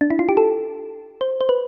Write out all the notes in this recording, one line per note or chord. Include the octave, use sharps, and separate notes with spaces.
D4
E4
F4
G4
A4
C5
C5
B4